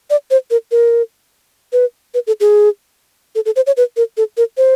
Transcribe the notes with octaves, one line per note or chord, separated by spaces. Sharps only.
D5
C5
A#4
A#4
B4
B4
A4
G#4
A4
A4
C5
C#5
B4
A#4
A4
A#4
C5